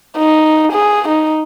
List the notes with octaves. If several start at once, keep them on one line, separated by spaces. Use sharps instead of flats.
D#4
G#4
D#4